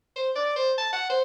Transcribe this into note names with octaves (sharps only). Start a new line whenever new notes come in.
C5
D5
C5
A5
F#5
C5